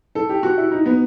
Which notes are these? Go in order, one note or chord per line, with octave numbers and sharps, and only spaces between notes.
A4
G4
F#4
E4
D#4
B3